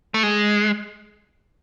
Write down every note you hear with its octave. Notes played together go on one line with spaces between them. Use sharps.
A3
G#3